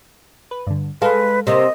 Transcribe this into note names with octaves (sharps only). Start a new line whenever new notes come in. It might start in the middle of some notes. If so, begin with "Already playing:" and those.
B4
G2 D3
G#3 A4 B4 F5
C3 A#3 D#5